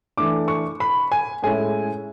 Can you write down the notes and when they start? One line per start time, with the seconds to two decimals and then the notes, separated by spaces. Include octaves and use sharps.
0.17 E3 A3 D4 D6
0.48 C#6
0.80 B5
1.12 G#5
1.42 A2 G#3 C#4 E4 G#5